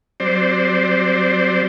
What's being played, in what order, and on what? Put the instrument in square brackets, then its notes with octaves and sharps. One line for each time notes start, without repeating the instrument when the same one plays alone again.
[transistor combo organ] F#3 G3 C4 C5 D5